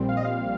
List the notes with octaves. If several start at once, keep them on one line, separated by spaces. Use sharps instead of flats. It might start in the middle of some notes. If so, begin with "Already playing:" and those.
Already playing: A#1 A#2 G3 C4
F5
D#5
F5